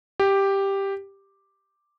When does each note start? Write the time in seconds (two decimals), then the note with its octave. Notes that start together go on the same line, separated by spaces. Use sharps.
0.20 G4